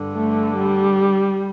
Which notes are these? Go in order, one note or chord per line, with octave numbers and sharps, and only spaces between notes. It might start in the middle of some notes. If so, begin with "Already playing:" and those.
Already playing: G2 D3
A3
G3